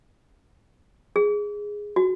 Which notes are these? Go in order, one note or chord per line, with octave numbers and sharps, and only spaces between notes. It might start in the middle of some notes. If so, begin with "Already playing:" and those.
G#4
F#4